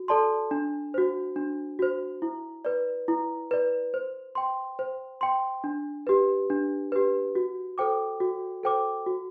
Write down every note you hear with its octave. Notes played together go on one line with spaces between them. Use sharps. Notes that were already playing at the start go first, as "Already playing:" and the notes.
Already playing: F#4
A4 D5 A5 C6
D4
F#4 C5
D4
F#4 C5
E4
B4 D5
E4
B4 D5
C5
G5 C6
C5
G5 C6
D4
G4 B4
D4
G4 B4
F#4
A4 C5 G5 D6
F#4
A4 C5 G5 D6
F#4